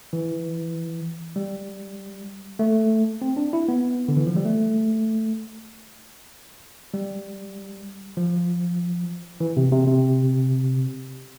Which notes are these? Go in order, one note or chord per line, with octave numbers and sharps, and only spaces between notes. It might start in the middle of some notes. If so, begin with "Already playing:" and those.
E3
G3
A3
C4
D4
E4
B3
D3
E3
F3
G3
A3
G3
F3
E3
C3
C3
C3